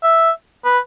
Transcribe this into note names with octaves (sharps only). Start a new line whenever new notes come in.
E5
B4